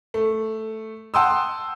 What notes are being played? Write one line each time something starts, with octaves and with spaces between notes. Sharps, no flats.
A3
F#5 G5 A5 C6 D#6 E6